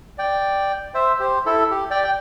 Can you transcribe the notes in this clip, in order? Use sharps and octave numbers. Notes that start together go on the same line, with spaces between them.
D5 G5
C5 E5
G4 C5
E4 A4
G4
D5 G5
G5